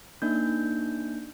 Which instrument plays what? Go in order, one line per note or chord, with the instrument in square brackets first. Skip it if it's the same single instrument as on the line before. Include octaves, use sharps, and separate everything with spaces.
[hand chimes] A#3 D4 D#4 G6